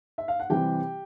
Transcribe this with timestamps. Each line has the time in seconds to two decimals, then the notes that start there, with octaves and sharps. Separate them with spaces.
0.18 E5
0.28 F5
0.40 F#5
0.50 C3 E3 G3 G4 G5